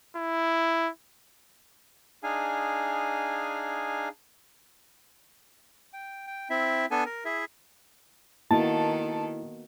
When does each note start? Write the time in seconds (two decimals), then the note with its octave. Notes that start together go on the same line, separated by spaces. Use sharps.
0.17 E4
2.23 D4 D#4 G#4 F5 G#5
5.93 G5
6.27 G5
6.50 C4 E4 E5
6.91 B3 D4 A4 G#5
7.05 A#4
7.25 E4 G#4 E5
8.51 D#3 A#3 B3 E4 F#4 A4 A5